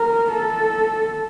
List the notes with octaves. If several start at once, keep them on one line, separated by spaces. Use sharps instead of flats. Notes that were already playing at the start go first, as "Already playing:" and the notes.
Already playing: A#4
A4